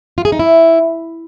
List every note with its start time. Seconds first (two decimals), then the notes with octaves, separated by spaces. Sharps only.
0.18 F4
0.25 G#4
0.32 D#4
0.39 E4